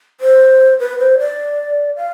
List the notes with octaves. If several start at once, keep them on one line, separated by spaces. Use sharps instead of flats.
C5
B4
C5
D5
F5